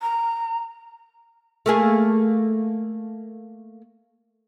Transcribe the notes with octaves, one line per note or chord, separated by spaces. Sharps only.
A#5
A3 A#3 G#4